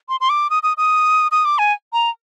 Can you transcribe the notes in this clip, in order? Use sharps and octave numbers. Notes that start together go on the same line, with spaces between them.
C6
C6
D6
D#6
D#6
D#6
D#6
D6
G#5
A#5